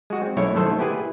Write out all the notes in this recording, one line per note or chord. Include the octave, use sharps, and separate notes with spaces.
G#3 F#4
C4
B1 F#2 A3 E4 C#5
D#3 F#3 A3 A4 C5
B3 E4 G4 G#4 B4